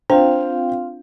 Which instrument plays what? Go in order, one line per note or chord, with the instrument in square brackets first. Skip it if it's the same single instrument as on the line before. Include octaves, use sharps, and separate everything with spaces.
[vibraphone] C4 F4 F5 [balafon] D4 [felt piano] C5 G5